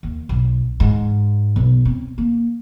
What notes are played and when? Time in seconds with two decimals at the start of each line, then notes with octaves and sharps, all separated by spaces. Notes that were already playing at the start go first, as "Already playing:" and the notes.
0.03 D#2
0.29 B1
0.80 G#2
1.56 B1
1.85 C4
2.18 A#3